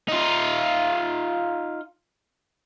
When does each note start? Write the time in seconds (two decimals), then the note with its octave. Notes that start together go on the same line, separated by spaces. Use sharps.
0.09 D#4 F4